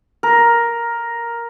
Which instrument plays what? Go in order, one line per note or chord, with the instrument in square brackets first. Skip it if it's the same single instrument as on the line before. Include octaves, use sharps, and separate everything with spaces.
[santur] A#4